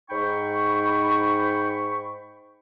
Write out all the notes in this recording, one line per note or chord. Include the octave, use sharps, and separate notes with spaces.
G#2 D#4 G5 B5 C#6